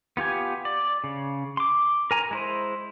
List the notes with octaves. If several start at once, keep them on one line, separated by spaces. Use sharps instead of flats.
B3 F4 G4 G#5
D5
C#3
C6 D6
A#4 G#5 A#5
G#3 E4 C5